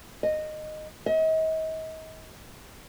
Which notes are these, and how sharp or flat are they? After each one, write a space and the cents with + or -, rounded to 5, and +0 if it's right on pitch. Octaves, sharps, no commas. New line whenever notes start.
D#5 -15
D#5 +40